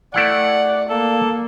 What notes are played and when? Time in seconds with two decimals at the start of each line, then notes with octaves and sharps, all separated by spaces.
0.14 A3 E4 D5 F#5 G5
0.89 A#3 A4